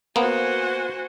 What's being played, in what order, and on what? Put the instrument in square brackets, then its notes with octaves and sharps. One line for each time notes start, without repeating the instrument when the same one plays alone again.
[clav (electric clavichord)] A#3 B3 [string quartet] F#4 C5 G#5